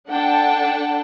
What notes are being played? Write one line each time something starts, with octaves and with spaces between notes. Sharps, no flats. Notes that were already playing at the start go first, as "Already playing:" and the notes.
D4 A4 F#5 G5 A5